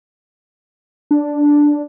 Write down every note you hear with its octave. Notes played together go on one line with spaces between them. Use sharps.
D4